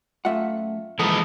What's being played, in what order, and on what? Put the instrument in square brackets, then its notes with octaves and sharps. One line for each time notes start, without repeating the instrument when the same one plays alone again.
[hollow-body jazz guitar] F#2 A3 F#5 [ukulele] F4 E5
[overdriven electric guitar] E3 F3 [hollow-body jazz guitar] G#3 A#3 A4 [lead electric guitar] B3 D#4